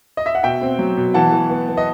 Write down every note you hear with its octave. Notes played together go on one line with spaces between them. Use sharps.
D#5
E5
F#5
B2 E5 G5
C4
F#3
B2
E3 F#5 A5
E3
B3
B3
D#5